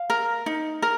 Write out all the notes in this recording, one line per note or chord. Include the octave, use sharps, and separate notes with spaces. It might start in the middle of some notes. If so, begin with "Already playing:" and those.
Already playing: F5
A#4
D#4
A#4